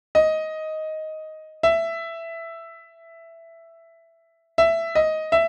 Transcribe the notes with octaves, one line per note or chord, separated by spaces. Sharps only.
D#5
E5
E5
D#5
E5